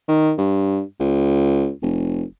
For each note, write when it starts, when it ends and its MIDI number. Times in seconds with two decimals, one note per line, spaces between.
0.08 0.33 51
0.38 0.81 43
1.00 1.70 37
1.82 2.23 29